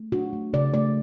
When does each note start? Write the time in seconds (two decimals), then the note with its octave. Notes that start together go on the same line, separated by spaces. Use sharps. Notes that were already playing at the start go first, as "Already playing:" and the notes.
Already playing: A3
0.12 D4 F#4
0.33 A3
0.53 C#3 D5
0.74 A3 D5